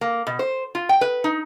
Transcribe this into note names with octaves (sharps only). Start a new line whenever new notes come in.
A#3
B2
C5
F4
G5
B4
D#4